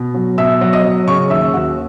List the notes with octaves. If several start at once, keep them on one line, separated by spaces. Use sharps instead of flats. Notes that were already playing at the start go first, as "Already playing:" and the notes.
Already playing: B2
F#3
B2 E5 E6
F#3
D#5 D#6
F#3
C#3 C#5 C#6
D#2 E5 E6
D#2 F#4 F#5